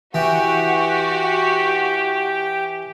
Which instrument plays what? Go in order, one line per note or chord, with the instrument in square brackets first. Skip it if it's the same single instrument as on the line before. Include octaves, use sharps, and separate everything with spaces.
[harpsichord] E3 [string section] F#4 [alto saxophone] G4 [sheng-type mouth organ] G5